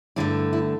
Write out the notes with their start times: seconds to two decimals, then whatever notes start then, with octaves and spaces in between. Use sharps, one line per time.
0.16 G2 D3 A3 E4
0.53 E4